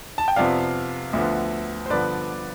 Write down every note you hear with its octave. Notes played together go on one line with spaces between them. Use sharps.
A5
G5
F2 C3 F3 B3 D5 F5
D2 D3 F3 B3
C5
G2 D3 F3 B3 B4 D5